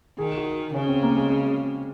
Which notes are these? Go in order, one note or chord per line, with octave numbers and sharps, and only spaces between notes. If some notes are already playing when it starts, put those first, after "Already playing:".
D#3 G#4
F#4
C#3 C#4
C4
A#3
G#3